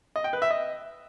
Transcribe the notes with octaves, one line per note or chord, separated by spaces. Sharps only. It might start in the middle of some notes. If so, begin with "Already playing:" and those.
D#5
G5
B4
E5
D#5